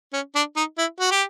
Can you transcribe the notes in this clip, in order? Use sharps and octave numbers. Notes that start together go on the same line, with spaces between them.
C#4
D4
D#4
E4
F#4
G4